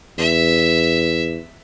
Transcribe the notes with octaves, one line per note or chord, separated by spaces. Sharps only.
E2 E5